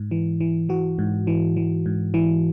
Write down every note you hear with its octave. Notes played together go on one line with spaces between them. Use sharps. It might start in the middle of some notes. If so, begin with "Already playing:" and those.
Already playing: G#2
E3
E3
E3 F#4
G#2
E3
E3
G#2
E3